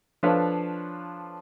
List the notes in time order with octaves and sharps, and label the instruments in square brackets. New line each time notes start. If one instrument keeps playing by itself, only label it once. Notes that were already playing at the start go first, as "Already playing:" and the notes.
[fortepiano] F3 D4 A4 B4 C#5 F5